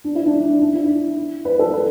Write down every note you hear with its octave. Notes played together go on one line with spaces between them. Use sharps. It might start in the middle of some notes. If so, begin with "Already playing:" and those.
D4
E4
D4
D4
E4
B4
A4
B4